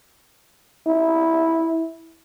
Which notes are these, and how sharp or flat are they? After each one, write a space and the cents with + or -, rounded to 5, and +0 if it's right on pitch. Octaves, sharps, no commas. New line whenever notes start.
E4 -10